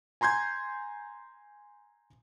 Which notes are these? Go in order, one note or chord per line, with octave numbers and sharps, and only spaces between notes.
G#5 A#5 C6 G6 G#6